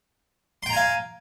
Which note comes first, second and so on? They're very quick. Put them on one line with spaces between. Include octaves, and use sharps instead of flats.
C6 G5 A#5 G#5 F5